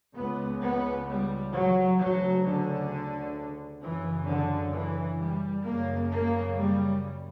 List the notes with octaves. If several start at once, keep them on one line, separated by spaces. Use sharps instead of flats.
C#2 C#3 B3
B3
G3
F#3
D2 C#3 F#3
D3
F#2 C#3 E3
D3
E3
G3
F#2 C#3 A#3
A#3
G3